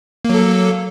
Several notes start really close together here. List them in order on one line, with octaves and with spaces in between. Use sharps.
A#3 F#3 A4